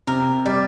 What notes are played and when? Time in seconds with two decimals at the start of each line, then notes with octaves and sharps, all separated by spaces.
0.07 C3 A#4
0.46 G3 D5